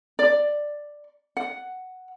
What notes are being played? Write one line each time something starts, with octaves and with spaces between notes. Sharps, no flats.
D5
F#5